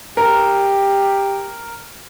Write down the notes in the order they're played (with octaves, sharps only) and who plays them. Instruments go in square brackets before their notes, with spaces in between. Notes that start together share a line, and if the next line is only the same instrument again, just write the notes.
[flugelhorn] G4 [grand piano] A#4